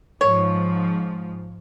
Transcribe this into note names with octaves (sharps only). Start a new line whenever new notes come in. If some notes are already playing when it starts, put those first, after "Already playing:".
G#2 F3 C#5